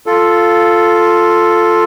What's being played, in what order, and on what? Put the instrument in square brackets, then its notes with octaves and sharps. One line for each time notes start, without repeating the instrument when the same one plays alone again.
[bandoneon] F4 A4